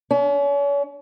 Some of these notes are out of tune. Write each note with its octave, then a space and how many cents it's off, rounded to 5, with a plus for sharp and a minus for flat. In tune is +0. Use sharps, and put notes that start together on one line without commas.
C#4 +40